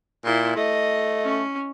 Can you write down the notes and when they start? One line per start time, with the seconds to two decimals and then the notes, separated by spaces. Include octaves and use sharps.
0.25 A#2 E4 C6
0.56 A3 D#5
1.24 C#4